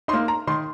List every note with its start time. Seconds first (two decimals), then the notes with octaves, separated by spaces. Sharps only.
0.08 D#4 C6
0.13 A#3
0.28 A#5
0.47 D#3 C6